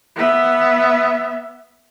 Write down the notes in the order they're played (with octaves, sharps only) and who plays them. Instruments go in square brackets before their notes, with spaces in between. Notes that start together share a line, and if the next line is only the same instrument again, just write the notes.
[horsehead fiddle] B3 E5